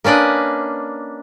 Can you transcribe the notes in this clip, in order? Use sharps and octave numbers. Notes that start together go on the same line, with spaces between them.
A#3 C#4 D4 B4 D#5